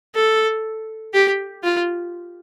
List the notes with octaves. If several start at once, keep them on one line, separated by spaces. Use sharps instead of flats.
A4
G4
F4